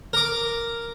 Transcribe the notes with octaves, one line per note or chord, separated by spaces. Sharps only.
A#4 D6